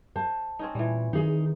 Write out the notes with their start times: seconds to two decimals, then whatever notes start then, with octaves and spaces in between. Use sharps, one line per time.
0.16 C5 A5
0.59 C4 C#4 D#4
0.75 A#2 E3 G3
1.13 D#3 D#4 G#4